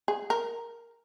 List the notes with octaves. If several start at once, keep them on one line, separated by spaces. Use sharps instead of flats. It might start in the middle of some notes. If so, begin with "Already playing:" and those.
G#4
A#4